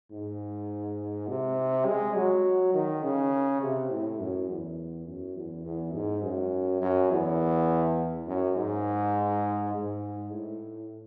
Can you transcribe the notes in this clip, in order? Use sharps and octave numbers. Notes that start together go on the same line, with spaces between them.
G#2
C3
G#3
F#3
D#3
C#3
C3
A2
F#2
E2
F#2
E2
E2
G#2
F#2
F#2
E2
F#2
G#2
G#2
A2